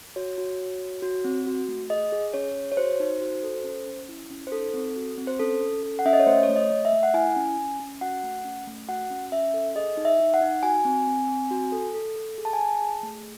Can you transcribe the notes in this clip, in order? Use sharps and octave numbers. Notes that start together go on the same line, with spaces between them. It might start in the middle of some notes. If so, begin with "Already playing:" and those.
F#4 C#5
F#4
F#4
F#4
F#4
C4
F#4
A3
G#4 D#5
G#4
C#4 C#5
G#4
C#5
F#4 C5
D#4
F#4
A4
C#4
C#4
E4
C#4
C5
D#4 A4
C4
F#4
C4
C5
C#4 A4
C#4
A4
F#5
C#4 E5
D#5
C#5
A3 C5
C#5
A3
D#5
A3
E5
A3
F#5
E4 G#5
C#4
C#4
C#4
F#4 F#5
A3
C#4
A3
F#4 F#5
C#4
C#4 E5
A4
G#4 D#5
D#4
E5
D#4
F#5
D#4
F#4 G#5
C4
C4
C4
F#4
A4
A4
A4
G#4
A5
G#5
G#4 A5
G#4
A3